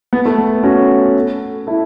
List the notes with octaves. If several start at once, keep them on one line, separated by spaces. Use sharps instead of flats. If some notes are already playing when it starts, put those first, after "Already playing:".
B3
A3
B3
C#4 F#4
E4 A4